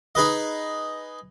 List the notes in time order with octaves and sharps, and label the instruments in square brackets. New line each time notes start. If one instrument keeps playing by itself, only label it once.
[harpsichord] D#4 G#4 B4 D#5